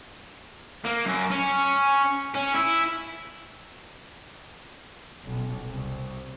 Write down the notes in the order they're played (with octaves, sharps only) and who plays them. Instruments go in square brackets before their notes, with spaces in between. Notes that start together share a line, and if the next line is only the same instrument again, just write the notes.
[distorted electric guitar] A#3
F#2
C#4
C#4
E4
[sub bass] D#1 [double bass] B1
[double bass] C2